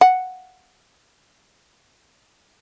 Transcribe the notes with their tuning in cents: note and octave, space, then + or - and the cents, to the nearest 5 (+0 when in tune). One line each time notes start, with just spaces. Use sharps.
F#5 +0